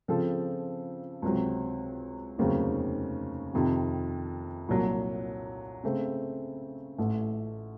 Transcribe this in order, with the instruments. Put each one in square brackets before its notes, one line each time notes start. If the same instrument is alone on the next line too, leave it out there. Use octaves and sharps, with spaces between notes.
[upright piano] C#3 F3 C4 F4 A4
C#2 C3 F#3 C4
F1 D#2 C#3 F#3 C4
F2 C3 D#3
C2 A#2 F#3
C#3 A3 C4
A1 A2 A3